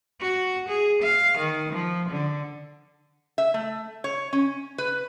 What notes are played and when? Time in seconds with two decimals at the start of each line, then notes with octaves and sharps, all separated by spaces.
0.20 F#4
0.69 G#4
1.02 F5
1.38 D#3
1.73 F3
2.09 D3
3.38 E5
3.54 A3
4.04 C#5
4.33 C#4
4.78 B4